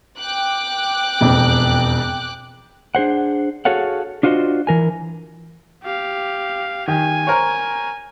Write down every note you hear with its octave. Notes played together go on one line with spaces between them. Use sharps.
G5 D6 F#6
E1 F2
D4 G#4 C5 F#5
F#4 G#4 A4 C#5 F5 F#5
D4 F4 F#4 C5 D#5
E3 A#4 G#5
G4 F5
D#3 G4 G#5
A#4 C5 C#5